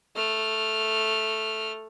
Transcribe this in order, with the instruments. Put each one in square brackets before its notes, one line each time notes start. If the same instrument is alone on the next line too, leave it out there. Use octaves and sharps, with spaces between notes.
[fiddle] A3 F6